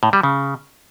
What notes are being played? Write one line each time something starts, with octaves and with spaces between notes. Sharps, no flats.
A2
G3
C#3